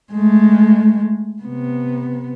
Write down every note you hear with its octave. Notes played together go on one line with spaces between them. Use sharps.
G#3 A3
C3 B3